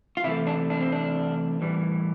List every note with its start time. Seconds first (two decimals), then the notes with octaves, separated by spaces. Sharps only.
0.17 F4
0.24 C3 E3 A3 E4
0.47 D4
0.70 D4
0.81 C4
0.92 D4
1.61 A2 E3 G3